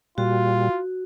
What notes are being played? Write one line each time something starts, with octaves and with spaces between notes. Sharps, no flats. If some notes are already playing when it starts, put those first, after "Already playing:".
A#2 G3 F4 F#4